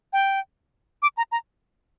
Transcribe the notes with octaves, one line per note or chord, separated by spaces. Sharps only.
G5
D6
A#5
A#5